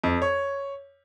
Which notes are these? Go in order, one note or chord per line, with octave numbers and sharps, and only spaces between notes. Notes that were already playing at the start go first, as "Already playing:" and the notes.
F2
C#5